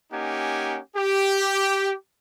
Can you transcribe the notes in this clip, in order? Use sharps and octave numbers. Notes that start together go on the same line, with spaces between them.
A#3 C#4 D#4 G4 F#5 G#5
G4